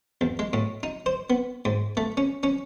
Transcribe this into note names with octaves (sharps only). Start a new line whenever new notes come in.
E2
G#3
A2
D#4
C5
B3
G#2
A3
C#4
C#4